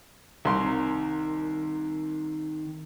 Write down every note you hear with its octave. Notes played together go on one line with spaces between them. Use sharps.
C2 D#3 A#4 C6